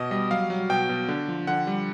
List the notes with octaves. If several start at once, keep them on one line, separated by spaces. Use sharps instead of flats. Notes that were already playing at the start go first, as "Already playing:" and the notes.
Already playing: B2 D#5
G3 D#5
F#3 F5
F#3
B2 G5
B2
D3
F3
D3 F#5
G3